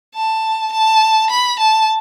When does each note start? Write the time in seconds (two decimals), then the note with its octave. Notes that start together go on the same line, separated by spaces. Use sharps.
0.15 A5
0.72 A5
1.30 B5
1.60 A5